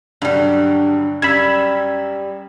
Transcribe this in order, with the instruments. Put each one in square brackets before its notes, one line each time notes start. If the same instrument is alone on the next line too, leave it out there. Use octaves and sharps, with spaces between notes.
[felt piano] G2 D3 [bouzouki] F#3 G3
[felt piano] F#2 [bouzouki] G3 [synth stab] B5 E6 G#6